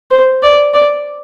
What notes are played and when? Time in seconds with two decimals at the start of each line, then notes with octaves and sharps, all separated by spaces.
0.11 C5
0.43 D5
0.74 D5